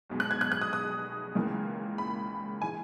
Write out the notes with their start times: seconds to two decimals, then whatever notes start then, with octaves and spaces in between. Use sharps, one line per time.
0.10 B1 B2 G#3
0.20 F#6
0.31 G#6
0.41 F#6
0.52 F#6
0.61 D#6
0.73 D#6
1.35 C#2 C#3 E3 A#3
1.98 B5
2.61 E3 G#3 G#5